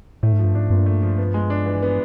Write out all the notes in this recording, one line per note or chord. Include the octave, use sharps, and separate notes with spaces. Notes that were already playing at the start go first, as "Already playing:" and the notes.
A2 A3
G#2
G2 F3
G#2 D4
G2 A#2
A3
F3
B3
G#3
D4
E3
B3